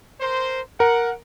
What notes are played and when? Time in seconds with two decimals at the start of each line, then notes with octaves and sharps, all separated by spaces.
0.21 A#4 C5
0.80 A#4 F#5